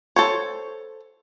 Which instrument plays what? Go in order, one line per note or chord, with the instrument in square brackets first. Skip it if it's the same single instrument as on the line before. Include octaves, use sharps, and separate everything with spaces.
[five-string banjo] A4 C5 C#5